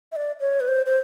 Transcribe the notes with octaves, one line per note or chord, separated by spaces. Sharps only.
E5
D5
C#5
B4
C5
C5